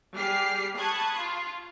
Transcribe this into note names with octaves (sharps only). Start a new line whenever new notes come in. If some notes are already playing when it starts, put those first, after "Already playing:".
G3 G4 G#4 F6 C7
A5 B5 C#6 D#6 F#6 G#6
F4